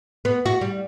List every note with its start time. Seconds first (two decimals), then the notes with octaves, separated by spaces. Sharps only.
0.25 B3
0.46 F#4
0.61 G3